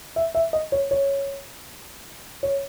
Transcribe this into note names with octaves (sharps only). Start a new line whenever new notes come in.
E5
E5
D#5
C#5
C#5
C#5